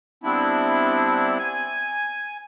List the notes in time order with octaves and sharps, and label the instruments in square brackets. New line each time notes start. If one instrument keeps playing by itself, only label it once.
[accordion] G3 B3 C4 D4 E4
G#5